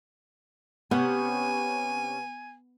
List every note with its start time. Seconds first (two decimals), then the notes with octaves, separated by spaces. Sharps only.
0.91 C3 B3 C#4 F#5 G#5